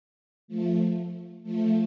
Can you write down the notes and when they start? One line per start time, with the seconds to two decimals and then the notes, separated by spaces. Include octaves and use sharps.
0.48 F3 A3
1.43 F3 A3